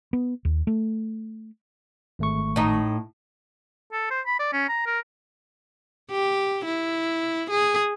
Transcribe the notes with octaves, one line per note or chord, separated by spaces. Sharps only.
B3
D#2
A3
G#1 A3 C#6
A2 D#4
A4
C5
B5
D5
C#4
A#5
A#4
G4
E4
G#4